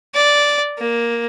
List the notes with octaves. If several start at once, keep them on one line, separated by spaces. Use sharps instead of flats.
D5
A#3